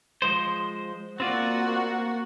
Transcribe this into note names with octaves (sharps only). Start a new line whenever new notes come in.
F3 G#3 C5
A#3 C4 F4 F#4 D5